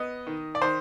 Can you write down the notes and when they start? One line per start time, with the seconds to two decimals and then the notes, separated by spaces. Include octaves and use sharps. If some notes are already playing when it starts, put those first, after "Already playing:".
Already playing: B3 D#5
0.27 D#3
0.55 D5
0.61 D#3 C5